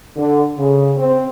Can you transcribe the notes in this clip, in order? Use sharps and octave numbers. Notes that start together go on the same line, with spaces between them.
D3
C#3
C4